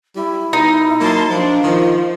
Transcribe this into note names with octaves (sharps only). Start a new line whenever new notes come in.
G3 E4
B2 D#4
F#3 A#3 A5 C6
F3 D4 F5
D#3 F3